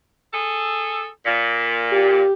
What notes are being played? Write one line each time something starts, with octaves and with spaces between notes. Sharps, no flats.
G#4 A4
A#2
G4